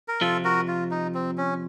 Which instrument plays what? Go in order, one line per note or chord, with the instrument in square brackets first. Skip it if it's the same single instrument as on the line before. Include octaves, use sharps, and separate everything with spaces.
[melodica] A#4
[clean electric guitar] F2 C3 F3 [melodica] F4 A4
[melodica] F#4 A#4
F4
D#4
C4
C#4